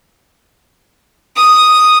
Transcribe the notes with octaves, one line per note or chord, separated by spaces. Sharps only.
D#6